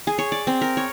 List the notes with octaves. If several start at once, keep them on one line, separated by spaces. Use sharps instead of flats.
G#4
C#5
D5
C4
A#4
C#5